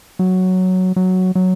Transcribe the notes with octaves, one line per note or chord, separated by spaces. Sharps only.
F#3
F#3
F#3